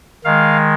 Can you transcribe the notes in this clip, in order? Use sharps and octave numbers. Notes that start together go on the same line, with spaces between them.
D#3 G#3 F5